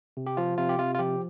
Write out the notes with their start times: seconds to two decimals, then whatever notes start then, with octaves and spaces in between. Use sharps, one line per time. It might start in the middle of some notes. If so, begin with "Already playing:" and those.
0.17 C3
0.27 G4
0.37 F3 F4
0.58 C3 F4
0.69 G4
0.79 C3 F4
0.95 F4
0.99 F3 G4